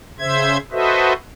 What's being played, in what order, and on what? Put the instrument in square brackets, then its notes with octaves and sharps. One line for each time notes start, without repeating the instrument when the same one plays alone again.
[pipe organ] C#3 C5 E5 G#6
F#4 A4 B4 C5 D#5 E5